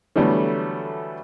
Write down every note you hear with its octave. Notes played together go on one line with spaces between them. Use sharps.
D3 E3 F#3 G3 A3 B3